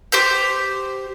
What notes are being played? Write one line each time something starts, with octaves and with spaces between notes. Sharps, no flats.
G4 C5 G6